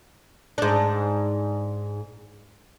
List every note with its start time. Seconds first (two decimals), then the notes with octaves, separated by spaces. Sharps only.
0.58 G#2 D4